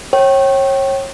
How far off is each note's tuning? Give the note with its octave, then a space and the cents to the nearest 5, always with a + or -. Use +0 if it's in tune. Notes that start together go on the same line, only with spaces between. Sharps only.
C#5 -30 G5 -20